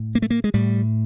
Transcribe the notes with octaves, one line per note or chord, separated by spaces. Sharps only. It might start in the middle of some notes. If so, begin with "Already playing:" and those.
Already playing: A2
A#3
A3
A#3
G#3
A2 G3